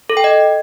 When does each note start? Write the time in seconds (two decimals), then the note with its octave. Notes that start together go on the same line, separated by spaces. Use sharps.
0.10 A4
0.17 G5
0.24 D#5